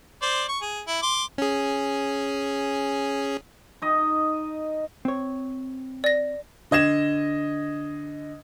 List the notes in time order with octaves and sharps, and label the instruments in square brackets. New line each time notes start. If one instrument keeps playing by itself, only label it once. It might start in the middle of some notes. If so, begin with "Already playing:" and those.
[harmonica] C5 D5
C#6
G#4
E4
C6 D6
[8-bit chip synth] C#4 G#4
[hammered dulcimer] D#4 D#5
[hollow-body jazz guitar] C4 C#5
[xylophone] D5 A#6
[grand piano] D3 D#5 G#6 E7